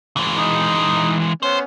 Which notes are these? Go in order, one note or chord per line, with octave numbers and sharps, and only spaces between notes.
E3 G#3
D#4 D#6
B3 C#4 C5